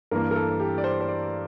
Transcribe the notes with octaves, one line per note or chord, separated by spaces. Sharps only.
G2 E3 A#3 A#4
A#4
A4
G4
D5
C5
C5
D5